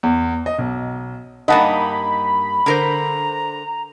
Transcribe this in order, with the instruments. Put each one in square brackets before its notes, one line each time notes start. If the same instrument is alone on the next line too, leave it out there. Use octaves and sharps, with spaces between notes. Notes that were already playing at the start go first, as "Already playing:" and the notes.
[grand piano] E2
D#5
B1
[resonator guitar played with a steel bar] G2 A#3 D#4 [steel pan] D#5 F#5 A5 [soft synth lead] B5
[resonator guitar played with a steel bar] D3 A#4 C5 [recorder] A#5